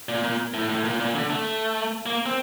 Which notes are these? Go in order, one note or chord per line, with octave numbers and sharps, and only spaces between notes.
A#2
A#2
A2
A2
A#2
A#2
D3
A3
A#3
C4